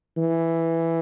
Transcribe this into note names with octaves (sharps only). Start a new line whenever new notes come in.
E3